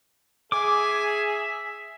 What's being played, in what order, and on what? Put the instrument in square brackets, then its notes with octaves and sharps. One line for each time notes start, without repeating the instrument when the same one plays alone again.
[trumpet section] G#4 [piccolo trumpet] E5 [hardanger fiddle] G#5 [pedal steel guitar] D6